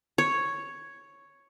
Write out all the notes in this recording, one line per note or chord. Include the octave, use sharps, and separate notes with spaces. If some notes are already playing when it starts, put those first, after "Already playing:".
C#5